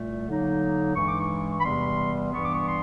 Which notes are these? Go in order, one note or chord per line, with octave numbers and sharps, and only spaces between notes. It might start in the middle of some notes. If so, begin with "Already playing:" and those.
Already playing: C2 A#2 A3
D3 F#3 A#3 D#4
G2 E3 G#3 C#6
D6
C#6
B5
E2 C3 E3 G3 B3 C6
G2 E3 G3 B3 C#6
D6
C#6
C6